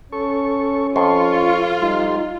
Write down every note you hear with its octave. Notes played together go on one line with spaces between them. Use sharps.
C#4 A4 C#6
F2 F4 C6 C#6
G3 D#4 C6